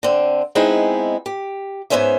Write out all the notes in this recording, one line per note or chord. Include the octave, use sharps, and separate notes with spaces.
D3 C4
G#3 B3 C4 D#4 E4 G#4
G4
G#2 F#3 B3 C#4 C5 E5